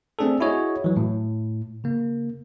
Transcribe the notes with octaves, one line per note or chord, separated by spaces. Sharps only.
A3 C4 D4 G#4 A4
E4 F#4 G#4 C#5 D#5
E3 F#3
A2
C#3 A#3